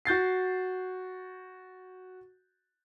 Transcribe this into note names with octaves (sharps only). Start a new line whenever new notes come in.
F#4 G6 A6 C7